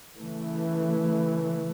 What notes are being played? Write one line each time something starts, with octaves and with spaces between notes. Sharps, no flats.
C#3 E3 A3